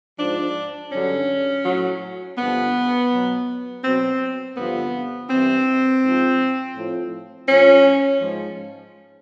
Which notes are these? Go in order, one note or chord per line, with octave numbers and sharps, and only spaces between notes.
G#2 F3 D4
G2 D3 F#3 C#4
A2 F#3
G2 D3 F3 B3
B2 F#3
B2 F#3 C4
G2 D3 F3 B3
G2 E3 C4
G#2 F3
A2 F3
A2 F3 C#4
G#2 F3